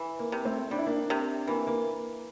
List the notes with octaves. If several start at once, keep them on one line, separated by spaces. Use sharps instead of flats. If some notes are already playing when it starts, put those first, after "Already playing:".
Already playing: E3
A#3
C3
A3 C4
G3 D4
E4
A#3 D4
C3
E3 A#3
A#3